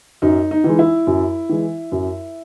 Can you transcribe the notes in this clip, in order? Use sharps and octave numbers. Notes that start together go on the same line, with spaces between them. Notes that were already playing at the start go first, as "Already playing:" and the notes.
F#2 D#4
D#4
E3 G#3
E4
F#2
E3 G#3
F#2